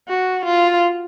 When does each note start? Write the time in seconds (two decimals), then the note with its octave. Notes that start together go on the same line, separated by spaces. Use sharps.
0.08 F#4
0.45 F4